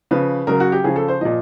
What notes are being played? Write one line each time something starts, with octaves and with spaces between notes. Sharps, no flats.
C#3 F3 B4
C#3 F#3 A#4
F#4
G4
C#3 F3 G#4
A4
C5
A#2 F3 D#5